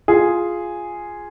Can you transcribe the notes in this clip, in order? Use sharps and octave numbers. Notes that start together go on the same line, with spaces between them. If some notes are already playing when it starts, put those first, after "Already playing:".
F4 G#4